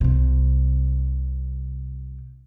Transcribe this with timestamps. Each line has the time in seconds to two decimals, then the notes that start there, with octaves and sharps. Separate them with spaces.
0.01 C2 C3